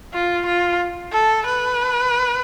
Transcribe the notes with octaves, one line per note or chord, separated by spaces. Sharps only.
F4
F4
A4
B4